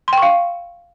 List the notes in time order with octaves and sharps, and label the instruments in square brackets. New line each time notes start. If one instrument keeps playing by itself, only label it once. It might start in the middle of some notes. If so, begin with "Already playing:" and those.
[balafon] C6
G5
C#6
F5